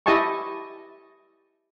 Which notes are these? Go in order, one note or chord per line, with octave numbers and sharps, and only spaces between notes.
E4 G4 D#5 G#5 A5 C#6